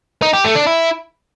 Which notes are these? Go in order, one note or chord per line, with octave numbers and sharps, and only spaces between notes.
D#4
G4
A3
D4
E4